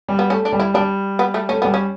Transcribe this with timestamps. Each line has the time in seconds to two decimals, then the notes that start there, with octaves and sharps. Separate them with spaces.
0.08 G3
0.19 B3
0.30 A3 C#4
0.45 D4
0.53 G3
0.60 E4
0.74 G3 D4
1.19 B3
1.34 A3
1.49 A3 C#4
1.62 G3 B3
1.74 C#4